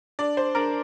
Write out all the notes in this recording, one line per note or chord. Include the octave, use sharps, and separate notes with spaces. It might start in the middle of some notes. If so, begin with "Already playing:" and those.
D4 D5
C5
D4 A#4